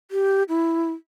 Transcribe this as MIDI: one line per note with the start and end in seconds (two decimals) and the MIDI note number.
0.11 0.43 67
0.49 0.91 64